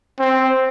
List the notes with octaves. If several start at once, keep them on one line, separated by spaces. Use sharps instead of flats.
C4